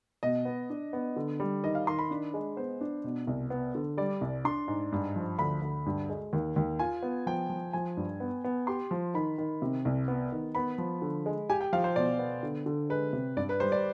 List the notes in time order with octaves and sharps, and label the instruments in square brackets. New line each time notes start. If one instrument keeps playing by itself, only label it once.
[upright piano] B2 [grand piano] D#5
[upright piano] B3
D4
B3
D3
G3
[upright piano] D#3 [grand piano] D#5
[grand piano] F5
[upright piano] D#3 [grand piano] C6
[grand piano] B5
[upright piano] D4
G#3
[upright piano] B3 [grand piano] C5
[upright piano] D4
B2
C2
B3
D3
[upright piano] G3 [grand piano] D5
[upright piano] C2
[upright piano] D4 [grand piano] C6
[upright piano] G#2
G2
F3
[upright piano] D2 [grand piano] B5
[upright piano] D2
G2
G#3
D#2
D#2
[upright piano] F4 [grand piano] G#5
[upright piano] B3
[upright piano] F3 [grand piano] G5
[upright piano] F3
[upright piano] F3 [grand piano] G#5
[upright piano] G2
B3
B3
[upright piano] G4 [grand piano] C6
[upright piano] F3
[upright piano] D#3 [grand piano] B5
[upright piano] D#3
C3
C2
B3
D#3
[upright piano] B3 [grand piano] B5
[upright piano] F3
D3
G#3
[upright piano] G4 [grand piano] G#5
[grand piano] G5
[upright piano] F3 [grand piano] F5
[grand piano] C5
[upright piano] B2 [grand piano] D5
[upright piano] B3
D3
D3
[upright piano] G#3 [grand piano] B4
[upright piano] C3
[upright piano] G2 [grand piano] D5
[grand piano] B4
[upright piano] G3 [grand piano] C5
[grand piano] D5